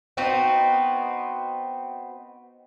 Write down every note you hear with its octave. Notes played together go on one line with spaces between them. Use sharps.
B3 C4 D#4 F#4